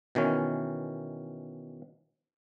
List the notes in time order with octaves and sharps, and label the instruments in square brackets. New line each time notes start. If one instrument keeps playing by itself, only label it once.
[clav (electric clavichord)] B2 D#3 E3 C#4